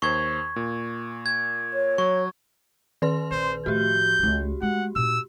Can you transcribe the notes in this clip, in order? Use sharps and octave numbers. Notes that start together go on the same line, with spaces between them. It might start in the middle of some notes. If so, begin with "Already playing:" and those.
D#2 C5 C#6 G#6
A#2
G#6
C#5
F#3 C#6
D#3 B4 C6
A#1 C5
A2 F3 F#4 G4 G6
D#1 C#2
G#3 F#5
A#2 D#4 E6